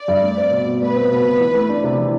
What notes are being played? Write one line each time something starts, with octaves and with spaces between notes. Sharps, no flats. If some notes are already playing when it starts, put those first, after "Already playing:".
Already playing: D5
G2
A3
C4
B2
B2
A3 B4
C4
B2
B2
E3
A3
D4
C3
E3